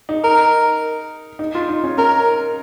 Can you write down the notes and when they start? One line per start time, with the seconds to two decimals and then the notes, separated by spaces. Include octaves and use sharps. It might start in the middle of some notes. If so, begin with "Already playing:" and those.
0.09 D#4
0.24 A#4
1.39 D#4
1.55 F4
1.69 D#4
1.84 C#4
1.98 C#4 A#4